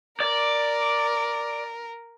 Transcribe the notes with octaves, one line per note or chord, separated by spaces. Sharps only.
A#4 D5